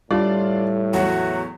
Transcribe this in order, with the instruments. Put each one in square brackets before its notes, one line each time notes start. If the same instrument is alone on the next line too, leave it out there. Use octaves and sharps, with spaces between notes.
[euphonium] A2 [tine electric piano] G3 [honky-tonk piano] D4 F4 D5
[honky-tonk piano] E2 F#3 [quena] F#4